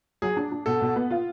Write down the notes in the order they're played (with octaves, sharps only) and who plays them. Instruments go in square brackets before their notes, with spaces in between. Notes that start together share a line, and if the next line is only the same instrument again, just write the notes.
[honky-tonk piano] F#3 [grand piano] G#4
[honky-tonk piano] D4
D4
[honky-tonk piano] B2 [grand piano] A4
[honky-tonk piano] B2
B3
F4